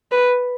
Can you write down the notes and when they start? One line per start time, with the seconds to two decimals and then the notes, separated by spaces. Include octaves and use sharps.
0.12 B4